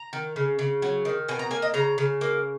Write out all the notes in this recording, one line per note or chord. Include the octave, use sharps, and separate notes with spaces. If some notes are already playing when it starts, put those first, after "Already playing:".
Already playing: A#5
D#3
C#3
C#3
F#3
D#3
B2 G#5
A#5
A#3 G#5
D#5
C#3 A#5
C#3
A#3